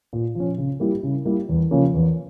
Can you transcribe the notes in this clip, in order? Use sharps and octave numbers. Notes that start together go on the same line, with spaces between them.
A#2
F3 C#4
C#3
G3 A#3 E4 G4
C#3
G3 A#3 E4 G4
E2
C#3 F3 A#3 C#4
E2